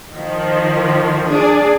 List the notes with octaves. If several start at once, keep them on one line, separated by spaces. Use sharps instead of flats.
D#3 F3
D4 G#4 D5